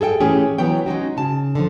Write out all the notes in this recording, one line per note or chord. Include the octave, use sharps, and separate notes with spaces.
G#4 A4 E5 G5
A2 E3 A3 C#4 G4 G#4
E3 F#3 B3 C#5 G5
G#3 C#4 D#4 F#4
C#3 A5
D3 F3